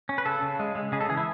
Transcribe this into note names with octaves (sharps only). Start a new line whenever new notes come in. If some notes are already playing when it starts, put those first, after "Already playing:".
C#4
B4
C#3 A4
C#3
G#3
G#3
C#3 G#4
A4
E3 G#4
E4